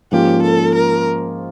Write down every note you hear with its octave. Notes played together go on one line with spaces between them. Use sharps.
G#2 F3 A#3 C#4 F4 G4
A4
A#4